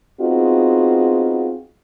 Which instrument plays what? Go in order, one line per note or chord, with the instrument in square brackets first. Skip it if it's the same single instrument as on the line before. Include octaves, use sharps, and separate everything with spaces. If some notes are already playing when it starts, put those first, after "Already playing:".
[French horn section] B3 C4 D#4 F4 F#4 G#4